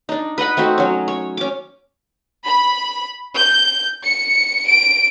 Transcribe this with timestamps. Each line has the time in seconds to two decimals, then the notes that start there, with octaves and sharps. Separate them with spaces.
0.09 D4 D#4
0.38 B4 D#5 F#5 B5
0.57 A3 C4 D#4 F#4
0.78 F#3 C#4
1.08 C#5
1.37 C#4 D6
2.45 B5
3.36 G6
4.05 C#7
4.67 D7